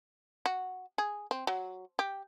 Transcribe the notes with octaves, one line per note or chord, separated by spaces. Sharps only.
F#4
G#4
C4
F#3
G4